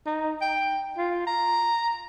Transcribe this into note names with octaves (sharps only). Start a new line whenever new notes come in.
D#4
G5
F4
A#5